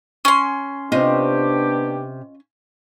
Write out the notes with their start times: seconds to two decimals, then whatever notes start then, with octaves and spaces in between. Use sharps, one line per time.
0.25 C#4 C6
0.92 C3 B3 C4 D4 F4 G4 D#5